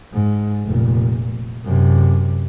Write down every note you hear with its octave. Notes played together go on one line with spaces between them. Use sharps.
G#2
F1 A#2
F#2 C3